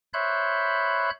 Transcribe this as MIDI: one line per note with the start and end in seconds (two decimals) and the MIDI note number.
0.14 1.10 72
0.14 1.10 73
0.14 1.10 76
0.14 1.10 83
0.14 1.10 90
0.14 1.10 91